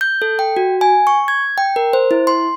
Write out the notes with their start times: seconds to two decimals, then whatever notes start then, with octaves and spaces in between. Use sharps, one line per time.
0.01 G6
0.22 A4
0.39 G5
0.57 F#4
0.81 G#5
1.07 C#6
1.28 G#6
1.58 G5
1.76 A#4
1.93 C5
2.11 E4
2.27 C6